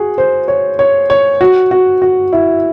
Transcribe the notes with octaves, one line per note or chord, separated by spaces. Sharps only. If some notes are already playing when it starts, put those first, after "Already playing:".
Already playing: F#4 G#4
C5
C#5
C#5
C#5
F#4
F#4
F#4
E4